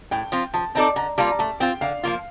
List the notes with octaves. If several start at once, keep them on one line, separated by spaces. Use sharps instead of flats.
A2 G5
F3 C4 F4
F3 A5
C4 D#4 A4 D5 A5
D3 A#5
G3 A#3 F4 A5
A#5
A3 A5
C4 F4 G5
D3 F5
F3 A#3 F4